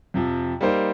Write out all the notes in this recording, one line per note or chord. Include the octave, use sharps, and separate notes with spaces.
F2 C3 F3
G3 A#3 D#4 C5